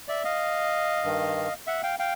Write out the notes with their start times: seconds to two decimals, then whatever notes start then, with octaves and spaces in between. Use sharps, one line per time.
0.08 D5 E5
0.24 D#5 F5
1.04 G2 D#3
1.67 E5 F#5
1.83 F5 G5
1.99 F5 G5